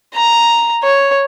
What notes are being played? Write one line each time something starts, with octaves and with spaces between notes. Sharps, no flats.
A#5
C#5